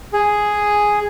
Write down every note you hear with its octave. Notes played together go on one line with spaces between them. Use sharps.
G#4